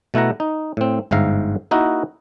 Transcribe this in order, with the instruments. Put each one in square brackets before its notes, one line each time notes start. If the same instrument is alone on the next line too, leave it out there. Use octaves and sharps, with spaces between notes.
[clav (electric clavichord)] B2 A3 E4 F#5 A#5
D#4
A2 C4
G1 G#2 E5 F5 A#5
A#3 D#4 E4 F#4 A#4